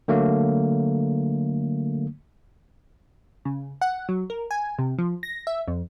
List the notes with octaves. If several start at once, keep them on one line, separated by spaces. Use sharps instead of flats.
D3 F#3 A3 A#3
C#3
F#5
F#3
A#4
G#5
C3
F3
A#6
E5
F2